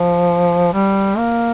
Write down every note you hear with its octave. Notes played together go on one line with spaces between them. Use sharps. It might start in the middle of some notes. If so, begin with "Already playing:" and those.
Already playing: F3
G3
A#3